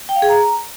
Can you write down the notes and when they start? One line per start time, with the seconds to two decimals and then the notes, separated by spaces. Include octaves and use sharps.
0.09 G5
0.16 F5
0.22 G#4
0.29 A#5